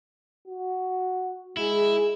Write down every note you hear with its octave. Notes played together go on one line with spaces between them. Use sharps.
F#4
G#3 E4 G#4